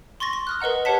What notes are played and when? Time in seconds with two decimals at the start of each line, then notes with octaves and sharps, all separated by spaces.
0.20 C6 C#6 A6 A#6
0.33 C6
0.47 D#6 F6 F#6
0.60 A#4 B4 D#5 F#5 A#5
0.85 G4 B4 C#5 F#5 A5 B6